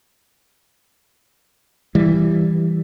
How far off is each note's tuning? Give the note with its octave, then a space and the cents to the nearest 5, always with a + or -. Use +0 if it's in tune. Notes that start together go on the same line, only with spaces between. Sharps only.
E3 +0 G3 +0